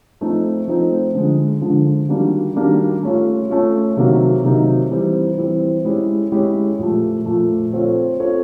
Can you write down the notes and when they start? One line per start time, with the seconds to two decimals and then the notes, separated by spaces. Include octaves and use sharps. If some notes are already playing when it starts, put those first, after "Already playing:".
0.21 F3 A3 C4 D#4
0.68 F3 A3 C4 D#4
1.15 D3 F3 G#3
1.61 D3 F3 G#3
2.09 D#3 G3 A#3 D4 F#4
2.56 D#3 G3 A#3 D4 F#4
3.03 A3 C#4 F4
3.50 A3 C#4 F4
3.97 C3 D#3 F#3 A#3 D#4
4.44 C3 D#3 F#3 A#3 D#4
4.91 E3 G3 C4
5.38 E3 G3 C4
5.85 G#3 C#4 E4 G4
6.32 G#3 C#4 E4 G4
6.79 A#2 F3 A3
7.26 A#2 F3 A3
7.73 C4 F4 A4 C#5
8.20 C4 F4 A4 C#5